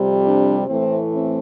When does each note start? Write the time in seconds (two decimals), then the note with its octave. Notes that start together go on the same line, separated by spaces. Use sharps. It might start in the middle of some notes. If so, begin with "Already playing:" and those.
Already playing: F2 C3 G3
0.25 D4
0.67 A2 E3 A3 C4
1.10 C4